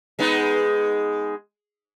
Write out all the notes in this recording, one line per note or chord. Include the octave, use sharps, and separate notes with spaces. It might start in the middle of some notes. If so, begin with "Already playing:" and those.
G#3 B3 D#4